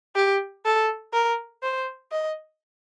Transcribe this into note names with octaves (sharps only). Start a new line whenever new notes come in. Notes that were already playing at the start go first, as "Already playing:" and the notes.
G4
A4
A#4
C5
D#5